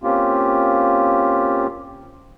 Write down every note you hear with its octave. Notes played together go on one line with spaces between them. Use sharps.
A#3 C4 C#4 F4 G4